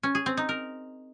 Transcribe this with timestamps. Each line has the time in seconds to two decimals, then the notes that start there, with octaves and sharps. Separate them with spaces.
0.03 C#4
0.15 G#4
0.26 C4
0.37 D#4
0.49 A#4